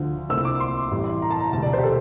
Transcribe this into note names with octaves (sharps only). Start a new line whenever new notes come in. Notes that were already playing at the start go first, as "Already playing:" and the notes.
Already playing: D2 D3 F3
C2 A#2 A3 C4 E6
D6
C6
A1 A2 G3
A#5
A5
A#5
E1 D2 C3 A5
D5
C5
G4
A4